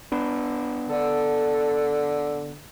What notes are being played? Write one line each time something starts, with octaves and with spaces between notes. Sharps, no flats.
B3 D4
D3 A4